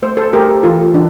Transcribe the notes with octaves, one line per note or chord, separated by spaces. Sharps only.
A3 C5
A4 C5
A3 G4 A#4
E3 F4 A4
E3 D4